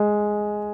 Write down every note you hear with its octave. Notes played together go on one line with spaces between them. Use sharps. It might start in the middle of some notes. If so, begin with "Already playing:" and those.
Already playing: G#3